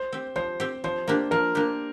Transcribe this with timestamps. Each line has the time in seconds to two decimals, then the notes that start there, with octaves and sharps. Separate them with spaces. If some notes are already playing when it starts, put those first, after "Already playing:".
Already playing: C5
0.12 C4 G4
0.36 F3 C5
0.60 C4 G4
0.84 F3 C5
1.08 A#3 D4 G4
1.31 F3 A#4
1.55 A#3 D4 G4